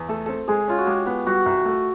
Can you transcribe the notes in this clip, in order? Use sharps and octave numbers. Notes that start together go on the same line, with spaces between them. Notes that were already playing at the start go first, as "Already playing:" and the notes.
Already playing: E2
A3 A4
C4 A4
G#3 G#4
C#4 F4
F#4
G#3 G4
B3
G3 F#4
C2
A3